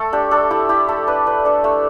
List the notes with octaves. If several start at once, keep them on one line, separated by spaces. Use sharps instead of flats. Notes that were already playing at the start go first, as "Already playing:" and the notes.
Already playing: A3 A4
D4 G4
D4 A4
E4 G4
E4 G4
A3 A4
D4 B4
D4 B4
D4 A4
A3